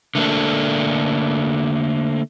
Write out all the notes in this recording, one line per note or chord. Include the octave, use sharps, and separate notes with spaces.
D3 A3 A#3 D4